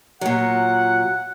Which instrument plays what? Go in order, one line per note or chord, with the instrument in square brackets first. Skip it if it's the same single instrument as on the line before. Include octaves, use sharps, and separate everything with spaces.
[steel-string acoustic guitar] A#2 F#3 [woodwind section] F#5